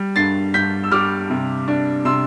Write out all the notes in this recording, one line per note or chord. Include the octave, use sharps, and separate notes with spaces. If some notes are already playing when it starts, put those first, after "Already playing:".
Already playing: G3
G2 A6 C7
G2 G6 B6
E6
G3 D6 F6
C3
D4
C3 C6 E6